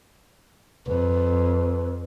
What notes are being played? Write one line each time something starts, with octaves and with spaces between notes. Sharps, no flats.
F2 B4